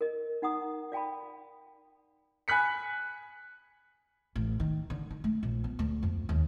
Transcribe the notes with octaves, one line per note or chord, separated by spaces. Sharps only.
A#4 D#5
D#4 F#5 A#5 D#6
D5 F5 G5 A5 B5
G#5 B5 F#6 B6 C#7
A1
D#3
D3
D#3
A3
A#1
B3
D2
F2
D#2